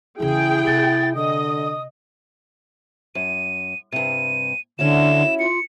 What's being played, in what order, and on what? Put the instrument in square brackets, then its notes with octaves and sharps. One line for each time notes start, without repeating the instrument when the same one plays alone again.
[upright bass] E2 C#3 [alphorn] E4 [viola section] G#4 G5
[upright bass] C3 [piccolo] A6
[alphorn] D3 [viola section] D#5 [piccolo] D#6
[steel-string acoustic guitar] F#2 [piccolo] D#7
[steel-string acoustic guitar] G2 C3 [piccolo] D#7
[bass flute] D3 [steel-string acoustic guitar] C#4 E4 F#4 [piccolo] E7
[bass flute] F4 [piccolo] C#7